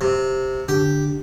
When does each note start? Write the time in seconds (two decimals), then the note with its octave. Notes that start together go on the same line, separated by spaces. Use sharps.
0.01 C3
0.68 D3 G4